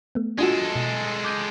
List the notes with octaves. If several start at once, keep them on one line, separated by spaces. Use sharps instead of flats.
A3 B3
G#3 D4 F4 F#4 A4
B2
D6 G6 D#7